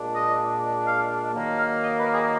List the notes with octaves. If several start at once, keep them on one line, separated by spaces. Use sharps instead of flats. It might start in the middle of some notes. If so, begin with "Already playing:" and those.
Already playing: A#2 G#3 D4
D#5
F5
D#3 F#3 A#3
F5
D#5
B4
G#4